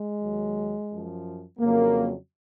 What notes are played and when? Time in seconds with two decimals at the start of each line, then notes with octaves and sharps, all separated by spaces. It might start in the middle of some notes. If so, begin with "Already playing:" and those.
Already playing: G#3
0.21 D#2 D#3 F#3
0.90 F#2 F3
1.59 F2 C#3 F#3 A#3